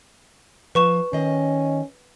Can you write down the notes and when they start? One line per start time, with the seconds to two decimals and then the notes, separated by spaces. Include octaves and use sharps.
0.75 F3 B4 C#6 E7
1.13 D#3 C#4 D#5